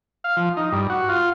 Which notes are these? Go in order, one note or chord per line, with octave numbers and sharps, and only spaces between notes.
F5
F3
D#4
G2
F#4
F4